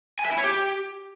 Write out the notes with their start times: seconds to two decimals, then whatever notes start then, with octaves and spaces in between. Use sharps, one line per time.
0.19 G#5
0.25 E5
0.31 E4
0.38 C#5
0.44 G4